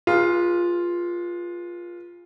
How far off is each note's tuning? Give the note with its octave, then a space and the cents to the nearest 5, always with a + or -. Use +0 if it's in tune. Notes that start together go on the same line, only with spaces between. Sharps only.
F4 +0 G#4 -20 B4 -35